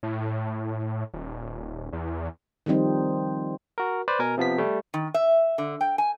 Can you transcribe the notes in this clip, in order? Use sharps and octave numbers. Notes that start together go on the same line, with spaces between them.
A2
D#1
E2
D#3 F3 G3 C4 D#4
F#4 A#4
B4 C5 D5
B2 A#4 G#5
C3 F3 B3 B6
G3 A3
D#3
E5
D3
G5
G#5